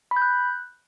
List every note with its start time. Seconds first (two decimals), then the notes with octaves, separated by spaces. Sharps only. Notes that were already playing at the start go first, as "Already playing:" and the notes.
0.11 B5
0.16 G6
0.22 F#6